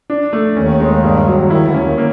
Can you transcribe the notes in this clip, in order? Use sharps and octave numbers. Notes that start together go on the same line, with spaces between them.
D4
A3
D#2 D#3 C#4
G#3
G2
F#3
D#2 D#3 E4
D2 D3
C#4
D#2 D#3
A#3